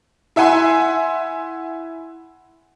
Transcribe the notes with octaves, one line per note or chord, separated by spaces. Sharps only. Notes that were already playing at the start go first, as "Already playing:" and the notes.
E4 E5 F#5 G#5 C6